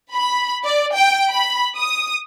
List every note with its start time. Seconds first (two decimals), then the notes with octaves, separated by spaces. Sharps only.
0.13 B5
0.64 D5
0.96 G5
1.32 B5
1.77 D#6